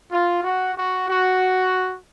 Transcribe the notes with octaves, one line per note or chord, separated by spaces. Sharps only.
F4
F#4
F#4
F#4